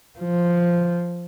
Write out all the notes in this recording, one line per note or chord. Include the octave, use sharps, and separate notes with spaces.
F3